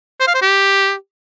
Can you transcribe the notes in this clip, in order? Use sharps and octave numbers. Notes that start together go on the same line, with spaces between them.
C5
F5
C5
G4